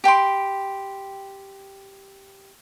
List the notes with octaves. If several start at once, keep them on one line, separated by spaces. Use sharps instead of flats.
G4 G5 B5 C6